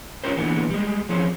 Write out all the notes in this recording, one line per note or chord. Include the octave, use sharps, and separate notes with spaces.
C#4 F4 G4 A#4 C5
A#2 D3 E3 B3
G3 G#3
F3 C4 C#4 G#4